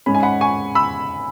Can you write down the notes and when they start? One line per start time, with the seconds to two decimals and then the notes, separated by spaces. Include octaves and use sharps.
0.06 G#2 G#3 C#4 B5
0.15 G#5
0.23 F#5 B5
0.41 G#5 C#6
0.75 B5 E6